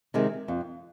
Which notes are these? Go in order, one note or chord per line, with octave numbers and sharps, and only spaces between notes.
C3 D#3 G#3
F2